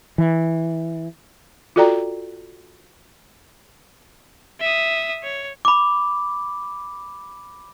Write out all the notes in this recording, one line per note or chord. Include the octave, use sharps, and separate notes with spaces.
E3
F4 F#4 A4 D5 G5 A#5
E5 D#6
C#5
B5 D6